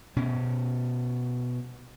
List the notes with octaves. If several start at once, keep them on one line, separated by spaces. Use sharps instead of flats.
B2 C#4